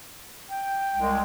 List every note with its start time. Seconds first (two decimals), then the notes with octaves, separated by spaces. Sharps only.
0.49 G5
0.97 C2 G#3